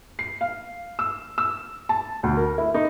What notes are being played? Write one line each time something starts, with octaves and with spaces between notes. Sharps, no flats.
C7
F5
E6
E6
A5
D2
A#4
E4
D#4